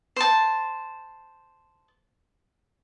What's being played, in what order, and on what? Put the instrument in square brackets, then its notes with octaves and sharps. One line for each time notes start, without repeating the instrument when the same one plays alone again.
[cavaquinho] C5 A5